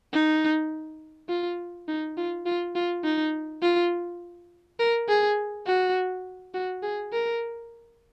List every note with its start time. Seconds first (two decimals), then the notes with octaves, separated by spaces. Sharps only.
0.13 D#4
1.29 F4
1.88 D#4
2.17 F4
2.46 F4
2.75 F4
3.04 D#4
3.62 F4
4.79 A#4
5.09 G#4
5.66 F#4
6.54 F#4
6.83 G#4
7.13 A#4